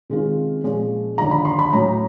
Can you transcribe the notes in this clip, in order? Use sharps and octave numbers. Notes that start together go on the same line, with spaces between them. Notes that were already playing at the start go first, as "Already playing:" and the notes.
C3 D#3 G#3 C#4 F4
A#2 F3 G#3 C#4
D#2 D3 F3 A#5
B5
C6
B5
A2 F#3 A3 C#4 A#5